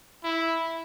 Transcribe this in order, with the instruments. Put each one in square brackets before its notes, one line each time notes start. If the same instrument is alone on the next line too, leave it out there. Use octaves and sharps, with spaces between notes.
[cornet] E4